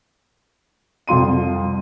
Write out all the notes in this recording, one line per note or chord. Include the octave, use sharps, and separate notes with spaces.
C2 F2 F4 C6 D#7